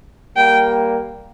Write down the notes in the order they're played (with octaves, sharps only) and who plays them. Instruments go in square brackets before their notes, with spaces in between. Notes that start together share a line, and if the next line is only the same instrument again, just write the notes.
[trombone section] G3 A#3 [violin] G5